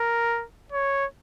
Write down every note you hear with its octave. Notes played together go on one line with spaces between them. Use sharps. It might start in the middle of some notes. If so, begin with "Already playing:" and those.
Already playing: A#4
C#5